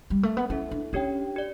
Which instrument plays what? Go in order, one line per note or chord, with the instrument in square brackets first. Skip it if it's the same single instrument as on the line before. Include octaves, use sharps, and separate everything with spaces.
[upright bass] G3
A3
B3
[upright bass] C#4 [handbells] E4 A4 E5
[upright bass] D4
[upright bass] C#4 [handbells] D4 G4 C#5 G5
[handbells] G4 D5